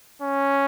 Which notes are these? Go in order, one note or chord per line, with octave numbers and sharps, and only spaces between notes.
C#4